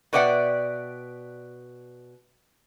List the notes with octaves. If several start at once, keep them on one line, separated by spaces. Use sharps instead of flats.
B2 B4 D5 E5 F#5 G5